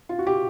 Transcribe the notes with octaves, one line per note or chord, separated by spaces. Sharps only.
F4
F#4
G4